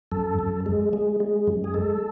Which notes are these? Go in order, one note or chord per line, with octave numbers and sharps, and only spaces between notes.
F#2 A4
F#2
G#3
G#3
G#3
F#2
G#4
G#3 A4